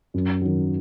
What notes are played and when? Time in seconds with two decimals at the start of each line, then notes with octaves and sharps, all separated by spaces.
0.14 F#2
0.42 D#3 F#3